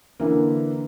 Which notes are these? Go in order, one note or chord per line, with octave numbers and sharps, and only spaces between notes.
D3 E3 A#3